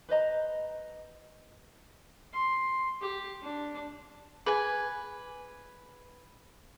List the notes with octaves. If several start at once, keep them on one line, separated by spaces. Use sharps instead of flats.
B4 C5 D#5 A#5
C6
G4
D4
G#4 B4 G#5